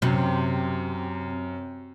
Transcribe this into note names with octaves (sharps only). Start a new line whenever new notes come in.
F#2 C3